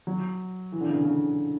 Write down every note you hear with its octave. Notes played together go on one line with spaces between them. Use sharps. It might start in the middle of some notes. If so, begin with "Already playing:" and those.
F#3
E3
D3
C#3
D3
C#3